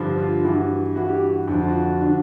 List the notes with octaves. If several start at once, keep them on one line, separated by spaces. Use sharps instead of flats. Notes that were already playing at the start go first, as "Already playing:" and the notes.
Already playing: G2 D3 F3
F4
G2 E3 F#4
G2 E3 F#4
G4
F#4
F2 D3 F3 F#4
F4
F#4
D3 F3